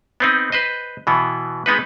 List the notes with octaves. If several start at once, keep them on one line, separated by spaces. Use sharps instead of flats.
B3 C4 D#4
B4 C5 D#5
B2 E3 B3
G#3 B3 D#4 B4